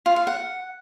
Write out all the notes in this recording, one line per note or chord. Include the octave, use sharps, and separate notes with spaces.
F4
F5
F#5